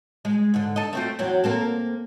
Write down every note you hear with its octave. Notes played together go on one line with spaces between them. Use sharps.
G#3
G#2 D3
A4 D#5
A3 C4 F4
E2 F#3 C4
A#3 C4 A4